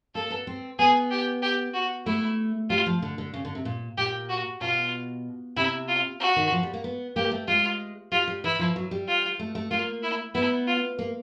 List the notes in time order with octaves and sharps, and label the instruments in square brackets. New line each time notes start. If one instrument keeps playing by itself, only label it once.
[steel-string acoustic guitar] A#3 [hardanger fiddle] A4
[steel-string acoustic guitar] B3
C4
[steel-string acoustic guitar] B3 [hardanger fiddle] G#4
[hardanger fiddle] G4
G4
F#4
[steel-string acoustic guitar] A3 [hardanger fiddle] E4
[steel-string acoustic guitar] G3 [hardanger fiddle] F4
[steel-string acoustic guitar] F3
D3
D3
C#3
D3
C3
A#2
[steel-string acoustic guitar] A#2 [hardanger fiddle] G4
[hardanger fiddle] F#4
[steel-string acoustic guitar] B2 [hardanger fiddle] F4
[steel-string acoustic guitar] C3 [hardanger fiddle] E4
[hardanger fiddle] F4
F#4
[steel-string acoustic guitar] D#3
F3
G3
A#3
B3
[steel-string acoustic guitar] A#3 [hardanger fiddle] G4
[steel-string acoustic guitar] A3
[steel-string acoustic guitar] G#3 [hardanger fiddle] F4
[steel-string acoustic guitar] G3 [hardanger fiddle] F4
[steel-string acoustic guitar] G3
[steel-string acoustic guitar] E3 [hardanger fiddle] E4
[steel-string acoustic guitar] F3
F#3
G3
[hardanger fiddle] F4
[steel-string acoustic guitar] A3
A3
[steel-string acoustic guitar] A#3 [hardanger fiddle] F4
[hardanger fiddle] E4
[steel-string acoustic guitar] B3 [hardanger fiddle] E4
[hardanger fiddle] F4
[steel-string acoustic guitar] A#3